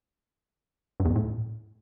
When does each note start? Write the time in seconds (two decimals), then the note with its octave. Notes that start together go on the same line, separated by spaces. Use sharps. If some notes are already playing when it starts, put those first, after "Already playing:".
1.00 G2
1.05 E2
1.10 F2
1.16 A2